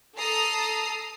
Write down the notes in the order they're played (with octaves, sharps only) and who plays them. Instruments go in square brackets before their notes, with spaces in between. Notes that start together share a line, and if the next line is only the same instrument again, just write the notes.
[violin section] A4 A#5 D#6 C7